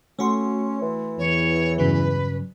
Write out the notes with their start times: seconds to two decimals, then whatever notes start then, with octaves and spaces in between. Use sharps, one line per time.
0.19 A3 C#4 F#4 C6
0.82 E3
1.19 E2 C#5
1.78 G2 C#3 F#3 B4